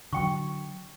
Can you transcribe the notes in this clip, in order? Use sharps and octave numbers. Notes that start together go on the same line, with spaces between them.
D3 F#3 G5 C#6